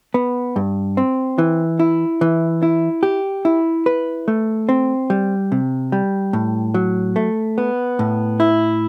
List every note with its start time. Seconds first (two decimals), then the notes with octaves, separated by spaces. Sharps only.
0.14 B3
0.56 G2
0.97 C4
1.38 E3
1.79 E4
2.21 E3
2.63 E4
3.03 G4
3.45 E4
3.86 B4
4.28 A3
4.69 C4
5.10 G3
5.52 C3
5.92 G3
6.33 A2
6.74 F#3
7.16 A3
7.58 B3
7.99 A2
8.40 E4